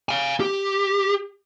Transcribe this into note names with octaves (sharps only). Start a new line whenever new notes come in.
F5 G#5
G4